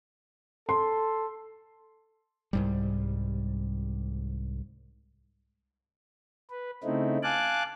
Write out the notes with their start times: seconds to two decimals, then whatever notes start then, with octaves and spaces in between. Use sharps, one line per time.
0.69 A4 C6
2.53 C2 G#2 G3
6.50 B4
6.84 C#3 A3 C4 D#4 E4
7.23 F5 G#5 A5 D6 F#6